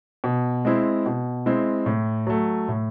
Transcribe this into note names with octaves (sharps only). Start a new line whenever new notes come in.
B2
G#3 C4 E4
B2
G#3 C4 E4
A2
F#3 A3
A2